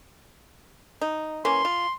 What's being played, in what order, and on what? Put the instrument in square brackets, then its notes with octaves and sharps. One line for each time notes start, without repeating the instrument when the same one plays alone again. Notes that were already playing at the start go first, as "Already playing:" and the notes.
[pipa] D#4
[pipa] E3 A#3 C#4 [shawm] C6
[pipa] F4